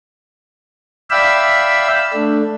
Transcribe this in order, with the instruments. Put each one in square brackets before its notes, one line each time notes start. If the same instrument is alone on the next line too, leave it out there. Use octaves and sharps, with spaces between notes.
[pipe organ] D5 E5 F5 G5 B5 E6
A3 D4